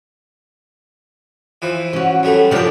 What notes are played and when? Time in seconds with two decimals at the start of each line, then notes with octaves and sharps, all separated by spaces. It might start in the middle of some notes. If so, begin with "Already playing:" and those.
1.62 E3 F3
1.93 C#4 F#4
2.23 F#2 G3 A3
2.51 C2 A#2 F3 D4 G5